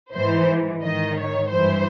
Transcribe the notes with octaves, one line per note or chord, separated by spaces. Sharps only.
G#2 E3 C5
G#2 D#3 D#5
C#5
G2 E3 C5